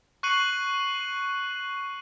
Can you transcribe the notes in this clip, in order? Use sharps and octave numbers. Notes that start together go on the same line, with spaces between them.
C#6 F#6 C7 C#7 D#7 F#7